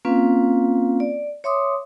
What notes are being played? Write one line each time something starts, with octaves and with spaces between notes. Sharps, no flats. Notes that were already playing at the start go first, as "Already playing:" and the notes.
A#3 C4 C#4 F4 B4 F5
D5
C#5 E5 C6 D6 D#6